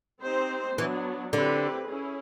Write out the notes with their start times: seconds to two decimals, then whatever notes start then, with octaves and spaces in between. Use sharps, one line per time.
0.23 C4 D#4 G4 C5
0.78 E3 F#3 B3 D4
1.33 D3 C4 E4 G4 B4
1.88 C#4 E4 G#4